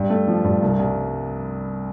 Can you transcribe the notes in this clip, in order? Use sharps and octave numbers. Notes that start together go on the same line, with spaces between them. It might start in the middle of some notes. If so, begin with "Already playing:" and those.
Already playing: G2
A3
F3
G2
C2
C2